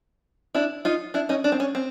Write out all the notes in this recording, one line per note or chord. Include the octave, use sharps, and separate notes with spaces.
D4 E4
D#4 F4
D4 E4
C#4 D#4
D4
C4
C#4
C4